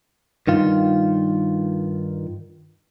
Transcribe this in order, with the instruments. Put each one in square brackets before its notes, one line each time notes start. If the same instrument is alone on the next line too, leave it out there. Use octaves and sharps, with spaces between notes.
[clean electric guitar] G2 D#3 F4